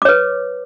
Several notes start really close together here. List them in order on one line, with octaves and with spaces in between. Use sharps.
D6 C#5 B4